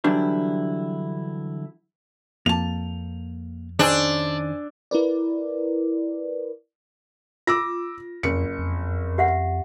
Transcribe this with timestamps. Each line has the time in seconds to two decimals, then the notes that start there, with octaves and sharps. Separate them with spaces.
0.04 D3 E3 F#3 G3 D4 E4
2.46 F2 A#3 A5 F7
3.79 D#3 C#4 D4 G#4 C5 G#5 E6
4.91 E4 A#4 B4 D5
7.47 F4 D6 E6 A#6
8.23 F#1 F2 C#7
8.59 F2
9.18 G4 E5 F#5